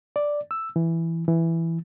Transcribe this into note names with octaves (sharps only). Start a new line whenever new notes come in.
D5
E6
E3
E3